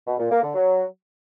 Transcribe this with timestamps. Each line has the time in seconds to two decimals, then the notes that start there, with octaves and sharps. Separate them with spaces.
0.07 B2
0.19 A#2
0.31 A#3
0.43 D3
0.54 F#3